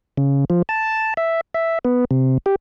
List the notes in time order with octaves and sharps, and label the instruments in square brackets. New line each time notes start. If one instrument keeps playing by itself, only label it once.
[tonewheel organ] C#3
F3
A5
E5
E5
B3
C3
G4